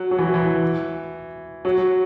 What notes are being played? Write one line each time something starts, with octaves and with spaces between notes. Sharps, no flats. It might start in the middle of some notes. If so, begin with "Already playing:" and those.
Already playing: F#3
F#3
E3
E3
F#3